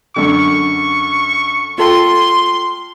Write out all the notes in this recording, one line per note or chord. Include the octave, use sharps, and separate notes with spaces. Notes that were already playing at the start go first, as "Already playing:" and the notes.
F#2 D3 C#6
F4 A4 G5 C6